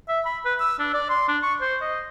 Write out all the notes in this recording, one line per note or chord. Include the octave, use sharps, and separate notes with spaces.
E5
B5
B4
E6
D4
D5
C6
D4
C#6
C5
D#5